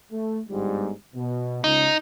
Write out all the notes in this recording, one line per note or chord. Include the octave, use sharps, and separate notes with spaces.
A3
G1 G#2 G3
B2
C#2 D#4